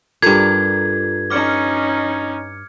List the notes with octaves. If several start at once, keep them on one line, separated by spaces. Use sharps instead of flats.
G2 F4 A4 A#4 G#6
C#4 D#4 D6 F6 C#7